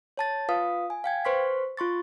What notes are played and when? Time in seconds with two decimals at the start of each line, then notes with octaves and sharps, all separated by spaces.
0.17 C#5 A5 A6
0.49 F4 B4 F5 D#6
0.90 G#5
1.04 F5 G5 G#6
1.25 B4 C5 C6 C#6 F6 B6
1.77 F4 C6 C#6 A6